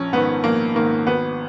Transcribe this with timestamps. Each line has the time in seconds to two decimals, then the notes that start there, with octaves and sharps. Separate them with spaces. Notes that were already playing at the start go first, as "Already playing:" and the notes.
Already playing: A#1 C#4
0.12 G#2 D#3 B3
0.44 A#1 A#3
0.75 G#2 D#3 A#3
1.07 G#1 B3